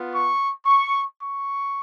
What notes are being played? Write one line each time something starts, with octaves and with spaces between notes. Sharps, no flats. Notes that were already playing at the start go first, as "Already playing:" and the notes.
Already playing: B3 F4
C#6
C#6
C#6